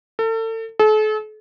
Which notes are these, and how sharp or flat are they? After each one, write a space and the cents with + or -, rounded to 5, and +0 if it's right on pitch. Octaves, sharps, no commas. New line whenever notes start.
A4 +35
A4 -40